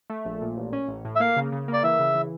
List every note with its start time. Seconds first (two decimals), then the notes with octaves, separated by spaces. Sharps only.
0.10 A3
0.25 A#1
0.42 A#2
0.57 A1
0.73 C#4
0.88 A1
1.05 A2
1.16 E5
1.20 A#3 F5
1.36 C#3
1.52 C#3
1.68 A#3 D5
1.84 E3 E5
1.99 C#3
2.15 E3